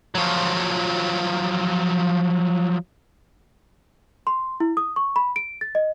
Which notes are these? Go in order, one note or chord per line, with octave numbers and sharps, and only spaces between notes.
F3 F#3
C6
E4
D#6
C#6
B5
D7
A6
D#5